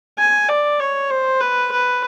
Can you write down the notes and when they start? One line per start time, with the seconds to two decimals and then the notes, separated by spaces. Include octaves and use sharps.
0.18 G#5
0.49 D5
0.80 C#5
1.10 C5
1.41 B4
1.71 B4